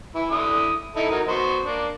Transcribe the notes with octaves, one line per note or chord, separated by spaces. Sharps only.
E3 E4
D3 E4 D#6
D#4 E4 A4
F#3 D#4 A#4
B3 F#4 C5
A#3 D4